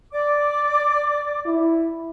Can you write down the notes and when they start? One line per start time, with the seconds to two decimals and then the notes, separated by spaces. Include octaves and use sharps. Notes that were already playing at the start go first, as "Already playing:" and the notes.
0.12 D5 D6
1.46 E4